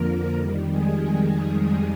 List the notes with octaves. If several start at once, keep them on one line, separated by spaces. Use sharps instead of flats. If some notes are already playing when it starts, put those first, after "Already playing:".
Already playing: F2 D3 F3 A#3 A#4
F2 D#3 G3
G#3 G#4